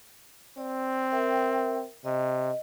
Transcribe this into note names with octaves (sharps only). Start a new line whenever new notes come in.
C4 D5
A#4 E5 G5
C3 D#5